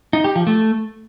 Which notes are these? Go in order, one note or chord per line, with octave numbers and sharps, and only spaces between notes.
D#4
G4
F3
A3